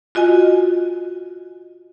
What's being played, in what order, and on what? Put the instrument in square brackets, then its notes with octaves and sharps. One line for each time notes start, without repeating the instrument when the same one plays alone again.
[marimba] F4 F#4 D#5 G#5